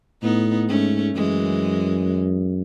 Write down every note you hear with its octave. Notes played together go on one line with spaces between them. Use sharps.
A2 B3 D#4
G#2 A3 C#4
F#2 E3 G#3